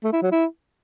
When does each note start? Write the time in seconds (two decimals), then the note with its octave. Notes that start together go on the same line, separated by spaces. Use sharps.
0.03 A3
0.13 E4
0.22 F#3
0.31 E4